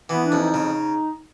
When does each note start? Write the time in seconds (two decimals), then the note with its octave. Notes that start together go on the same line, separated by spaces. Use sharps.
0.09 E3 B3
0.24 D4
0.32 F2
0.39 D#4
0.54 C#3